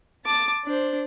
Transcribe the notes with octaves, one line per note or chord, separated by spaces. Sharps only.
A5 D6
D4 C5